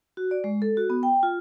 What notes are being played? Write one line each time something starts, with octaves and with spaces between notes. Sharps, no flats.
F#4
D5
G#3
A4
F#4
B3
G5
F4